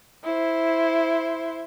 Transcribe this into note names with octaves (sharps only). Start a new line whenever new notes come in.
E4 C5